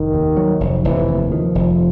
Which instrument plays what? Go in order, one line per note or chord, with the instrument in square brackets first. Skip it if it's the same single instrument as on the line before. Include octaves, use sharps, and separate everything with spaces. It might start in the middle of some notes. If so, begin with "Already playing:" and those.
Already playing: [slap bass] F1 [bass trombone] D#3
[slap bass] D#2
F#3
F1
[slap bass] F1 [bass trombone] E3
[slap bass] D#2
[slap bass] D#3 [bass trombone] F3
[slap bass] F1